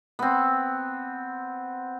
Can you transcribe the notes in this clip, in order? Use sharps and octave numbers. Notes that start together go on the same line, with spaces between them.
B3 C4